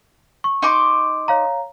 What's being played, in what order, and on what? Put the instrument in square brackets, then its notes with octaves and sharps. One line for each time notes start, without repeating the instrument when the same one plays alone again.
[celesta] C#6
[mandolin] D#4 C6 D6
[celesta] C#5 F5 A#5